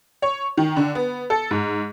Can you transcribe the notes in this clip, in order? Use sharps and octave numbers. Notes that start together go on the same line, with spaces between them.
C#5
D#3
D3
B3
A4
G#2